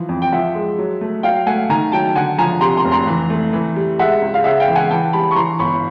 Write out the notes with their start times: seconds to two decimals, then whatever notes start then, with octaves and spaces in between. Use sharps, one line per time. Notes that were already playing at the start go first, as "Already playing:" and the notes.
Already playing: E3 F3
0.09 F2
0.22 G5
0.32 F3 E5 F#5
0.55 G#3
0.78 F#3
1.01 A3
1.23 F#3 F5 G5
1.46 A3 F#5 G#5
1.69 D#3 G#5 A#5
1.92 F#3 G5 A5
2.15 D3 F#5 G#5
2.38 F3 G#5 A#5
2.61 C3 A#5 C6
2.77 A#5 C6
2.85 F1
2.91 A#5 C6
3.07 E3
3.30 A3
3.53 E3
3.76 G3
3.99 G#3 E5 F#5
4.22 C#2
4.34 F5
4.44 C#3 E5 F#5
4.60 F5 G5
4.68 E3
4.75 F#5 G#5
4.90 E3 G5 A5
5.13 G3 A5 B5
5.31 C#6
5.36 E3 A#5 C6
5.59 G1 B5 C#6